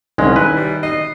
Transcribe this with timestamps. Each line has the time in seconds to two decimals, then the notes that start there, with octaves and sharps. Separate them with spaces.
0.18 C2 D#3 G#3 C#4
0.36 E4 B4
0.56 G3
0.83 D#5 C7